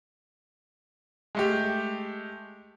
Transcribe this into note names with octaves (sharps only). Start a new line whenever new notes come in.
G#3 A3 G4